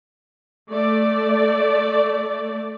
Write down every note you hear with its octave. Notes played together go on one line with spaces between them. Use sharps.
A3 D5